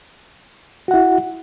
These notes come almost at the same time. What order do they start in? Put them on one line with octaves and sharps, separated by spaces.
F#4 F#5 E4